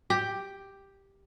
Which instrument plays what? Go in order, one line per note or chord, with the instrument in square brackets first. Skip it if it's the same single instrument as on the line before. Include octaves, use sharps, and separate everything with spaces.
[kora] G4